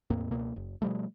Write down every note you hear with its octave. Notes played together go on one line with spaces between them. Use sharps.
E2 A2 A#3 C4
C#2 B2 A#3
F#1
B2 F3 G3 A3